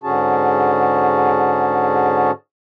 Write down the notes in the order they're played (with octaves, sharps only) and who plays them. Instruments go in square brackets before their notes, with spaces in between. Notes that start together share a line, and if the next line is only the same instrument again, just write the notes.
[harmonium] G#2 D3 C#4 F#4 G#4 A5